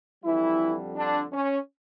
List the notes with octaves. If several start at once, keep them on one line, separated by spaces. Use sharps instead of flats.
F2 D3 E3 G3 E4
D3 D4
C#4